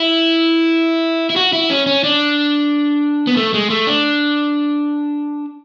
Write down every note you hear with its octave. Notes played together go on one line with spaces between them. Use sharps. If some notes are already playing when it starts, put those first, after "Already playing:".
Already playing: E4
E4
F#4
E4
C#4
C#4
D4
B3
A3
G#3
A3
D4